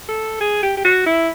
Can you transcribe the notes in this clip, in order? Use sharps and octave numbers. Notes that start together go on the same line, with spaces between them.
A4
G#4
G4
G4
F#4
E4